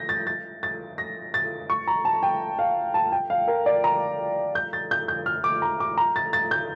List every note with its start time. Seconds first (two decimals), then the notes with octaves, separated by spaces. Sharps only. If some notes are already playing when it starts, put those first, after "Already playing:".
Already playing: G6 A#6
0.09 A6
0.27 A6
0.63 A6
0.98 A#6
1.34 A6
1.70 C#6
1.88 A#5
2.05 A5
2.23 G5
2.59 F5
2.94 A5
3.12 G5
3.30 F5
3.48 A#4
3.66 D5
3.84 A#5
4.55 G6
4.73 A6
4.91 G6
5.08 G6
5.26 F6
5.44 D6
5.62 A#5
5.80 D6
5.98 A#5
6.16 A6
6.33 A6
6.51 G6